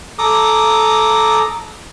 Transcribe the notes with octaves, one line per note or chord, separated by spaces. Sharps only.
A4 A#5 D6 D#6